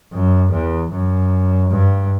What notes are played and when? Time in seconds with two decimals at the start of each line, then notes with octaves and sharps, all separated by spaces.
0.13 F#2
0.52 E2
0.91 F#2
1.71 G2